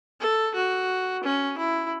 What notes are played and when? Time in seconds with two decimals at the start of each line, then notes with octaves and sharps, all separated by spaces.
0.20 A4
0.55 F#4
1.24 C#4
1.58 E4